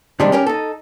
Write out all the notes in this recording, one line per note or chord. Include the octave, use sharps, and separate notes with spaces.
C3 D#3 G3 G#3 D4
C#4 G4 A#4
D#4 A4